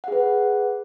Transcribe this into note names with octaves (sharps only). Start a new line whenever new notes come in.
G#4 B4 F#5